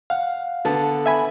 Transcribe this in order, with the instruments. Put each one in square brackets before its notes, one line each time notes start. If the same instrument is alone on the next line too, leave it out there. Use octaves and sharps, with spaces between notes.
[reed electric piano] F5 F#5
[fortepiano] D3 B3 A5
[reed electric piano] E5 G#5 B5